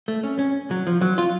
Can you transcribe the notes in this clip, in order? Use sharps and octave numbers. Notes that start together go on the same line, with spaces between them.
A3
C#4
C#4
F#3
F3
F#3
F4